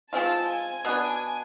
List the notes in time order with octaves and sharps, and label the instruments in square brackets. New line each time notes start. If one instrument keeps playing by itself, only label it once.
[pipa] F3 G#3 C4 F4 [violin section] A5
[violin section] G#5
[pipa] B2 B3 D4